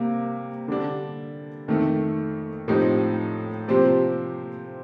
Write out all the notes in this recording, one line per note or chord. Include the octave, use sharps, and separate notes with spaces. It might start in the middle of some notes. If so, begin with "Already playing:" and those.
Already playing: C3 G3 A#3
D3 G3 D4
F2 D#3 A3
A2 F3 C4 D#4 G4
C3 F3 C4 G4 C5